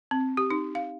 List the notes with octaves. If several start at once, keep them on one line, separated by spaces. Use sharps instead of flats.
C4
G4
D#4
F5